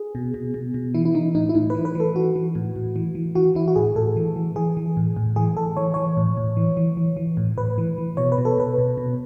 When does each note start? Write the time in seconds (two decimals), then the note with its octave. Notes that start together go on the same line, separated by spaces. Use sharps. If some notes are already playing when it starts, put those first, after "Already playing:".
Already playing: G#4
0.15 B2
0.34 B2
0.54 B2
0.74 B2
0.94 E3 E4
1.05 E4
1.14 E3 D#4
1.35 A2 D#4
1.49 E4
1.55 A2 D#4
1.70 E3 B4
1.85 B4
1.95 E3 A4
2.15 E3 F#4
2.36 E3
2.55 A2
2.76 A2
2.96 E3
3.15 E3
3.35 E3 F#4
3.55 E3 E4
3.68 F#4
3.76 A2 G#4
3.95 A2 A4
4.16 E3
4.36 E3
4.56 E3 G#4
4.77 E3
4.97 A2
5.17 A2
5.36 E3 G#4
5.57 E3 A4
5.77 E3 C#5
5.94 E3 C#5
6.17 A2
6.37 A2
6.57 E3
6.77 E3
6.97 E3
7.17 E3
7.37 A2
7.57 A2 B4
7.78 E3
7.98 E3
8.17 B2 C#5
8.32 B4
8.38 B2
8.45 A4
8.58 B2 B4
8.78 B2
8.97 B2